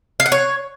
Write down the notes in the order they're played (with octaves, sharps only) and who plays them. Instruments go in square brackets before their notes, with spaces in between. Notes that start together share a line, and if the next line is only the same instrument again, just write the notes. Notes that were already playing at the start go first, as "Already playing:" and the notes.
[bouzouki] F5
F#5
C#5